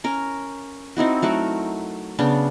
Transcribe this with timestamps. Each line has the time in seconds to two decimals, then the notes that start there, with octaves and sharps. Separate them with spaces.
0.04 C#4 A#4
0.97 C4 D#4 E4 F#4
1.22 F#3 A3 F#4 A#4
2.19 C#3 B3 D4